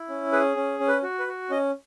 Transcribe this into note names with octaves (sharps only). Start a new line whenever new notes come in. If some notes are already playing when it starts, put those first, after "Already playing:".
Already playing: E4
C#4
G#4 B4
C#4
C#4
B4
F#4
B4
F#4
C#4 D#5